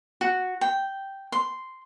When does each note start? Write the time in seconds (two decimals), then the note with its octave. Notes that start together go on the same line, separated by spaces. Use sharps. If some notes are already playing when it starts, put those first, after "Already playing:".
0.21 F#4
0.61 G5
1.32 C6